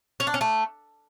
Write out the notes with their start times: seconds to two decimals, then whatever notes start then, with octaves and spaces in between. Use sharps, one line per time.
0.20 C#4
0.27 D4
0.34 C#4
0.41 A3